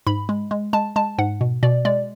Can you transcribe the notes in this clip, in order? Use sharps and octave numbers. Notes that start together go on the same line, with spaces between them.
G#2 B5
G#3
G#3
G#3 A5
G#3 A5
G#2 F#5
B2
B2 D5
G#3 D5